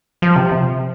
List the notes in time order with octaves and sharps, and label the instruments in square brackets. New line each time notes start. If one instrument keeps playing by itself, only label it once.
[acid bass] F3
C3